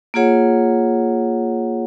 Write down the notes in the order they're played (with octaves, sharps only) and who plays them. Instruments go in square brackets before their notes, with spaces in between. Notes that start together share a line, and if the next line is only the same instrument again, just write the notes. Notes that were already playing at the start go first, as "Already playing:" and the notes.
[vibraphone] A#3 F4 G#4 C#5 F#5